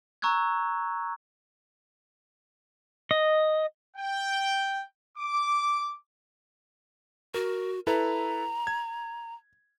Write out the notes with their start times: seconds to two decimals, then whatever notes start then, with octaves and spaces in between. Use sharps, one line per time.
0.22 A#5 C#6 E6 F#6 G#6
3.11 D#5
3.97 G5
5.18 D6
7.34 F#4 A#4
7.87 E4 A4 B4 A#5
8.67 G#6